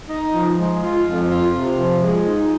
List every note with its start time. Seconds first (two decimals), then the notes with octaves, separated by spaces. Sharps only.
0.08 D#4
0.32 F3
0.57 G#3
0.82 F4
1.06 F2
1.29 F4
1.54 C3
1.78 F3
2.03 G#3
2.26 D#4